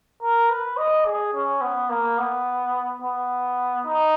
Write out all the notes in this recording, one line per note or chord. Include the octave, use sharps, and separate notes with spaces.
A#4
B4
D#5
G#4
C#4
B3
A#3
B3
B3
D#4